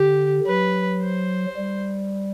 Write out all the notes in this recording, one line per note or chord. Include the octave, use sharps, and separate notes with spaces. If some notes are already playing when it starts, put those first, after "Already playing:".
Already playing: D3 G4
F#3 B4
C5
G3